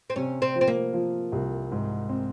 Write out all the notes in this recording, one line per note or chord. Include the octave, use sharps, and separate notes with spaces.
C4
C3 C#4
C4
F3
C4
A#3
F3
C2
G#2
C4